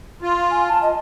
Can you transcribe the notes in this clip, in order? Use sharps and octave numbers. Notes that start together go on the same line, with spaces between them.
F4
G#5
A5
D#5